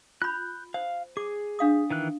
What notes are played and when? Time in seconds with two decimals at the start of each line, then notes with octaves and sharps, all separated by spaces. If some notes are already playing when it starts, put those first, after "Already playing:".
0.22 F4 B5 F#6 G6
0.74 C5 F5
1.17 G#4 D6
1.59 D4 F5 D#6
1.90 D#3 E3 F#6